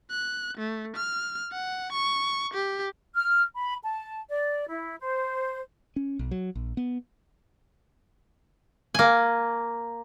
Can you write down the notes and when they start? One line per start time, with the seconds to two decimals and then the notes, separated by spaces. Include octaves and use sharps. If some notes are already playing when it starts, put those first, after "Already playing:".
0.11 F#6
0.57 A3
0.96 F6
1.52 F#5
1.92 C#6
2.54 G4
3.15 F6
3.54 B5
3.83 A5
4.30 D5
4.68 E4
5.00 C5
5.96 C#4
6.19 B1
6.31 F#3
6.55 A#1
6.77 B3
8.94 A#3 G#5